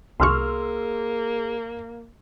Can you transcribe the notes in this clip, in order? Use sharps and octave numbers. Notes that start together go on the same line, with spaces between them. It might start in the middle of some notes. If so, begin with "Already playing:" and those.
C2 A#3 G#4 C6 C#6 E6 F6